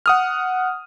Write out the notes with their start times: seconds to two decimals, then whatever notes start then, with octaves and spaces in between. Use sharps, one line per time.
0.06 F#5 D#6 F6